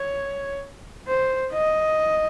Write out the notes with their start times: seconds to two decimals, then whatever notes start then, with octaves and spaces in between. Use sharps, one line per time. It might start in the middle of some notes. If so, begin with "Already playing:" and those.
Already playing: C#5
1.07 C5
1.52 D#5